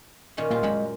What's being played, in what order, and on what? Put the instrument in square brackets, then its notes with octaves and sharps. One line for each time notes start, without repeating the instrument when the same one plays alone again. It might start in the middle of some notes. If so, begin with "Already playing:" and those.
[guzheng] A#2 D#3 C#4
[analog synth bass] A#2 [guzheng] G3 F4
[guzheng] F#2 A#2 B5 [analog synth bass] G#3